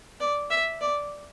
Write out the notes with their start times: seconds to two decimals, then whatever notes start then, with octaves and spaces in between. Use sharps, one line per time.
0.20 D5
0.50 E5
0.81 D5